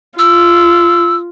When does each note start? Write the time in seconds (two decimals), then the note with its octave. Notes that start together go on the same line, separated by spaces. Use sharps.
0.19 F4 E6